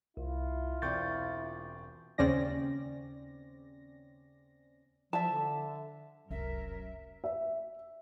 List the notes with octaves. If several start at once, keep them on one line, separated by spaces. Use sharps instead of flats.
C2 E4 F4
E1 C4 D5 C#6 G6 A6
D#2 C#3 C4 C#4 D5 A#6
F3 E5 A5
D3
F1 C2 F#2 F#3 A#4 E5
E5